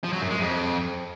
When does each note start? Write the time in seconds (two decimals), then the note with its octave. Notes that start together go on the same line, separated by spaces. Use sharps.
0.04 F3
0.13 F#3
0.22 F#2
0.31 G#3
0.39 F2